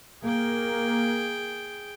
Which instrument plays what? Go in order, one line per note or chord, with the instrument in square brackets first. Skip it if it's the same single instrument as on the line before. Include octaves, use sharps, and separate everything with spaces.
[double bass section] A#3 [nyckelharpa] G#4 G5